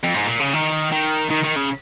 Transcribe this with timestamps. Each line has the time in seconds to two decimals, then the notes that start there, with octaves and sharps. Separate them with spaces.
0.04 F2
0.15 G#2
0.27 A#2
0.40 C#3
0.54 D#3
0.92 D#3
1.31 D#3
1.44 D#3
1.56 C#3